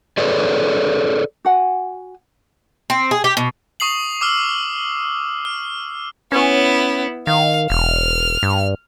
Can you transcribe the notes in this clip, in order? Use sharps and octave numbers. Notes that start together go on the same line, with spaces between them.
G#4 A4 B4 C#5 D5
F#4 F#5 G#5
C4
G#4
G4
B2
C#6 D#6 C7 F#7
D6 E6 F6
F6
B3 C#4 E4
D#3 F5
E1 F6
G2